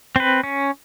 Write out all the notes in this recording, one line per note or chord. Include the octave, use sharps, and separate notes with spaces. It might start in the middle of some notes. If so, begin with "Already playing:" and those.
C4 B4
C#4